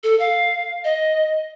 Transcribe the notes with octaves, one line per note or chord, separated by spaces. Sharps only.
A4
F5
D#5